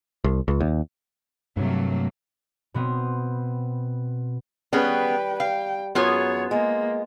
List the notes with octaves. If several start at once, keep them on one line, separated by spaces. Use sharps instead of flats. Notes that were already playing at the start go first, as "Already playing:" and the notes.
C2
C#2
D#2
G2 C3 F#3 A3 A#3
B2 B3 C4
G3 B3 C#4 G#4 B4 G5
F5 G5
F#2 B3 F4 G#4 C#5
G#3 A#3